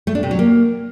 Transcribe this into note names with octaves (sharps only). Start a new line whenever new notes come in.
A3
D4
C3
F#3
A#3